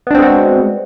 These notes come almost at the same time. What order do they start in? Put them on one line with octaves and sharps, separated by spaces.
B3 D4 C4 G#3 F#4